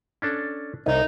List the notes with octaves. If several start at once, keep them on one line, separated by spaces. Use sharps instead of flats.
C#4 D4 A4
C2 D#4